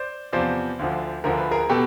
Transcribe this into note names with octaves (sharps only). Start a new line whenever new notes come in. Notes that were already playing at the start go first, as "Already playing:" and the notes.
Already playing: C5 D5
E2 C3 F3 C5 D5
D2 D3 F3
D2 D3 F3 A#4
B4
G#4 A#4
B2 G4 A4